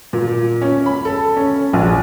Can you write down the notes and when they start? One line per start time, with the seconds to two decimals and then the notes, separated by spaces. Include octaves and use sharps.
0.13 A#2
0.62 C#4
0.86 B5
1.05 A4
1.37 C#4
1.73 A#1